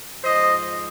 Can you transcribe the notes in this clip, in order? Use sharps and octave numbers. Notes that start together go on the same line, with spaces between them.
G#2 F3 C5 D#5